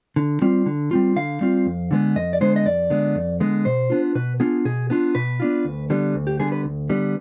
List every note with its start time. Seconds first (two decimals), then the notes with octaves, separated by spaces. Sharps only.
0.16 D3
0.42 G3 C4 F4
0.66 D3
0.91 G3 C4 F4
1.16 D3 F5
1.41 G3 C4 F4
1.66 F2
1.91 D3 G#3 B3
2.16 F2 D#5
2.33 D5
2.41 D3 G#3 B3 C5
2.56 D#5
2.65 F2 D5
2.90 D3 G#3 B3
3.15 F2
3.40 D3 G#3 B3
3.65 B2 C5
3.90 B3 D4 F4
4.15 B2 B4
4.40 B3 D4 F4 G#4
4.65 B2 G#4
4.90 B3 D4 F4
5.15 B2 B4
5.40 B3 D4 F4
5.65 D2
5.90 D3 G3 B3
6.15 D2
6.27 G4
6.39 D3 G3 B3 G#4
6.52 B4
6.65 D2
6.90 D3 G3 B3